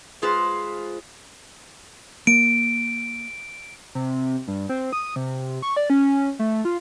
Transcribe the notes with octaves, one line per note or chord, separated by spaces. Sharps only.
G#3 F4 B4 C5
A#3 D7
C3
G2
C4
D#6
C3
C#6
D5
C#4
A3
F4